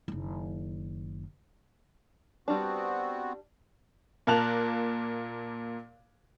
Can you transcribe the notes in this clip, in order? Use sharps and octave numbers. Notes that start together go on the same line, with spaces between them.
F#1 D#3
G3 B3 C4 D4 F#4
A#2 A#3 A#4 A5 F#6 F7